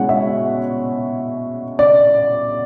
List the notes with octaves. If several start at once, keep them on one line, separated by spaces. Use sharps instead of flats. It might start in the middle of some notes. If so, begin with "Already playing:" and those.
Already playing: B2 G#3 C#4 E4 F#5
E5
D5